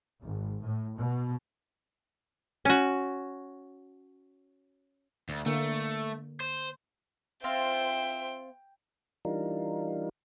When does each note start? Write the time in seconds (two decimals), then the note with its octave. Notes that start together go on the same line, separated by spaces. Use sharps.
0.21 G#1
0.62 A2
0.97 B2
2.65 C#4 F#4
5.29 D2
5.46 D3 A3 A#3
6.40 C5
7.44 C4 F4 C5 E5 G5
9.25 E3 G3 D4 D#4 F4 A#4